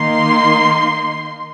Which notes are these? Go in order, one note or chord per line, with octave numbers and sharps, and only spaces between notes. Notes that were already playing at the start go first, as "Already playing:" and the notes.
Already playing: D#3 A#3 D#4 C6